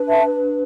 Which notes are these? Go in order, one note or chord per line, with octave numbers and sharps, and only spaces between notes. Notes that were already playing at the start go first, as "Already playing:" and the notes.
Already playing: D4 B4
E5 A5